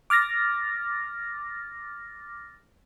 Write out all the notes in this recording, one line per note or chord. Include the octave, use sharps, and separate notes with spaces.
D6 F6 A6 A#6